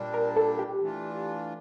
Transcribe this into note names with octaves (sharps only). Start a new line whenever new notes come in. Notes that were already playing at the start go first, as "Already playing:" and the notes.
Already playing: A#2 G3 D4
A#4
A4
G4
E3 A3 D4 F4